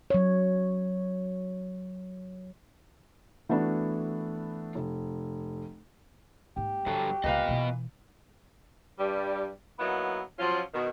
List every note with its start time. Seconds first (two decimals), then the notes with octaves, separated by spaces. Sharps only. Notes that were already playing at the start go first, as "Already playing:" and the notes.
0.10 F#3 C#5
3.49 E3 A3 B3 D4 E4 F#4
4.75 F1
6.56 G#2 A#3 G4
6.86 G2 D3 F3 F#3 A4
7.24 C#2 A#2 C#3 B3 B4 D#5 F5
7.48 B2 E3
8.99 G2 G3
9.79 F#3 A#3 B3 D#4 E4
10.39 F3 F#3 C#4 F4
10.74 B2 D#3